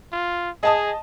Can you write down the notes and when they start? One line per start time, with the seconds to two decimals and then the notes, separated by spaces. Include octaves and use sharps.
0.12 F4
0.63 G#4 D#5 A5 D#6